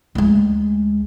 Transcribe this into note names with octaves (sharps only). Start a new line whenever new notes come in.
D2 G#3